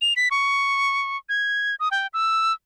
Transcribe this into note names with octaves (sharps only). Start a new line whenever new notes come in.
F7
B6
C#6
G#6
D#6
G5
E6